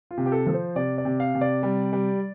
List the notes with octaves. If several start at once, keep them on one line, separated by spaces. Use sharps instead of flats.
F4
C3
G4
A4
F3 A4
C5
C3 D5
D5
C3
F5
C3
D5
G3
G3